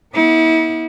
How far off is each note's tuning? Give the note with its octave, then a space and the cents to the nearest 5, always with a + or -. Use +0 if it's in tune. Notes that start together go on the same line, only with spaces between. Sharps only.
B3 -25 E4 -40